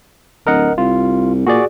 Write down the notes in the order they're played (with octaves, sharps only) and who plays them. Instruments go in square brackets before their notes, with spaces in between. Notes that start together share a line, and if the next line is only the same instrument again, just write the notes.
[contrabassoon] D1 [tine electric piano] A#4 D#5 F#5
[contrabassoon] C2 [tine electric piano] F4
[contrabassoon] A#2 [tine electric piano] F#4 G#4 D5